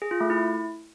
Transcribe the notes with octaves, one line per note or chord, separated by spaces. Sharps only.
G#4
F4
A3
E4